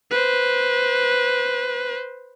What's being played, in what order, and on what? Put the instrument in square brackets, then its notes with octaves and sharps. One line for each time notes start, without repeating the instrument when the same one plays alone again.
[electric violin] B4 C5